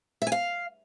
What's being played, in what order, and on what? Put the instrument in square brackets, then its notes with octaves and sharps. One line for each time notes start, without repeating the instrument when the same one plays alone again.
[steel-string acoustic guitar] E5
G#5
F5